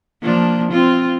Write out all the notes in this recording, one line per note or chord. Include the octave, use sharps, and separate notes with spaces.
F3 A#3 D4
C4 F4